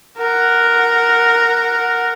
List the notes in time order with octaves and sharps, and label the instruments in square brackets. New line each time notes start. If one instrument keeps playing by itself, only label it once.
[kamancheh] A#4 F#5